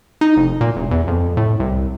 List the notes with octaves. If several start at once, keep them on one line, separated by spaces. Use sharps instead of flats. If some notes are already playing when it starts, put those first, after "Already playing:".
D#4
F1
A#2
E1
E2
F2
A2
C2